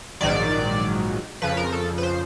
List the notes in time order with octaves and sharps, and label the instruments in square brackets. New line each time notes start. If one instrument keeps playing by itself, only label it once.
[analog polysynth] A#1 G#2 D#3 F#3 D5
F2 C#3 F3 B4
A#4
A4
B4
C5